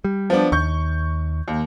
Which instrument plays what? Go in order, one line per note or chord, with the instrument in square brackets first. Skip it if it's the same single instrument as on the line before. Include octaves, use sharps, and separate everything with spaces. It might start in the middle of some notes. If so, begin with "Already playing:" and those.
[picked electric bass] G3
[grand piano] F3 B3 D4
[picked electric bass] D#2 [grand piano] C#6 G6
[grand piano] D#2